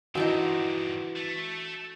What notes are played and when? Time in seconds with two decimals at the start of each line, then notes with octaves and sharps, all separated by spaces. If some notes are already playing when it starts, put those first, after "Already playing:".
0.15 G2 D#3 E3 C4 D4 D#4 F#4
1.16 A3